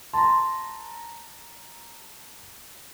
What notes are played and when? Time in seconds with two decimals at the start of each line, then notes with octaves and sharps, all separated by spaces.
0.13 A5 A#5 C6